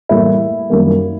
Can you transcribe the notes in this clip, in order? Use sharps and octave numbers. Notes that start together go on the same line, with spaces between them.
A2 E3 G3 A#3 E4
F#2 D#3 G3 A#3